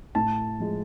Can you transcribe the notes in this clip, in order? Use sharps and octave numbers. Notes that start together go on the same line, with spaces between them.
A2 A5
F3 G#3